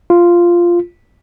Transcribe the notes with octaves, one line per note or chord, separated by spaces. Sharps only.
F4